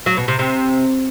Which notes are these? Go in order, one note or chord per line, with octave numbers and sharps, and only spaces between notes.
F#3
B2
C3
C3